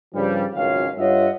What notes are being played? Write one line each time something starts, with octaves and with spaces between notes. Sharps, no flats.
G2 C#3 F3 G3
G#1 C#2 F#2 C#4 F5
G2 F4 C#5 D#5 E5 F#5